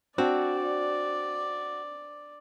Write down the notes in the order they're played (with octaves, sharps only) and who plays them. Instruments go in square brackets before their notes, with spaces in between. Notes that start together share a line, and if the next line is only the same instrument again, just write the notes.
[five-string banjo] C4 [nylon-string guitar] D4 [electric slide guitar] F#4 [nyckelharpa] D5